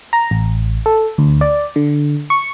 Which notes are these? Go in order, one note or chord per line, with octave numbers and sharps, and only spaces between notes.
A#5
A1
A4
D2
D5
D3
C#6